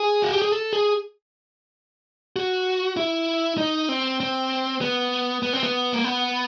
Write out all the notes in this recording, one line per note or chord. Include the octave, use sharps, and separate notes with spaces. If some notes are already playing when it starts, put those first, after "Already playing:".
Already playing: G#4
F#4
G4
G#4
A4
G#4
F#4
E4
D#4
C4
C4
B3
B3
C4
B3
A#3
B3